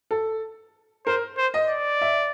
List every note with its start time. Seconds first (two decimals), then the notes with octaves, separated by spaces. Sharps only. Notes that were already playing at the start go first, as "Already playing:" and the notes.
0.11 A4
1.06 A#4 C5
1.38 C5
1.54 D#5
1.69 D5
2.01 E5